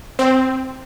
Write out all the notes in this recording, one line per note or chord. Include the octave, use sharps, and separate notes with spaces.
C4